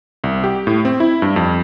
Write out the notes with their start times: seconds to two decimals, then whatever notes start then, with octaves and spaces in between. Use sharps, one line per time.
0.24 C2
0.44 G4
0.67 A2
0.85 C4
1.00 E4
1.22 G2
1.36 F2